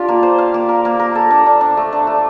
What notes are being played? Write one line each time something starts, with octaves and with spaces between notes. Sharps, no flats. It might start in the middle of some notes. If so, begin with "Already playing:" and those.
Already playing: D4 F4 G4
A#3
C5
F5
A#3
A#4
A#3
A#4
A4
D4
D4
D4
A3
D4
A3